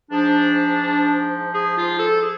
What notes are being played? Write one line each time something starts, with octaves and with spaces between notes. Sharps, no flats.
G#2 F3 D4
G#4
F4
A4
G#4